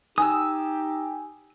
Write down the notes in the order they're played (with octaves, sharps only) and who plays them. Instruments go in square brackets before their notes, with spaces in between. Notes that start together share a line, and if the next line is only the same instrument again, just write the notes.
[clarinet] D#4 [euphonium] G4 [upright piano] G#5 [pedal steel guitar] D#6 E6